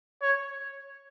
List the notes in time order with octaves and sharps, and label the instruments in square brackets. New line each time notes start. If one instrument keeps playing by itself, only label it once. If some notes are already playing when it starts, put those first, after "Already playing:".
[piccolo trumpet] C#5